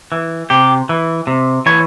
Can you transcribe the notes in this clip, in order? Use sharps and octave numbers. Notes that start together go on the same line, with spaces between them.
E3
C3 G4
E3
C3
E3 C#5